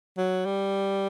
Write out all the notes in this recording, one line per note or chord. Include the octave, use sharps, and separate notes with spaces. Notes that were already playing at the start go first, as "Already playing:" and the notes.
F#3
G3